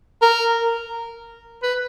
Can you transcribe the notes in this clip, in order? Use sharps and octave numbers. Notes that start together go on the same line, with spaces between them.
A#4
B4